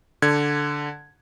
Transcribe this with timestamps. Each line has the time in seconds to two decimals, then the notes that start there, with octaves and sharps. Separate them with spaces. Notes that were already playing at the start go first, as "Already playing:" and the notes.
0.22 D3 G#6